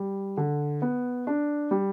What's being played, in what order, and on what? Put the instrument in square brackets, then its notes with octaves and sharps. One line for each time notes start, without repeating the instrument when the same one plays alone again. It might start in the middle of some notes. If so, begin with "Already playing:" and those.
Already playing: [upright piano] G3
D3
B3
D4
G3